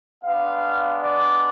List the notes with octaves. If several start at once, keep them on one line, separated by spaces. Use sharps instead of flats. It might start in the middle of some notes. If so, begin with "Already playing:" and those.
G#3 B3 D4 F5
D5